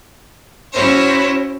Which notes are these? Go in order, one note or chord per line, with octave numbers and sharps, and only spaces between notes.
C#4 E4 F#4 C5 C#5